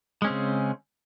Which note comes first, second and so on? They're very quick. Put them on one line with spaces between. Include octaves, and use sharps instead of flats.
G#3 C#4 C4 C#3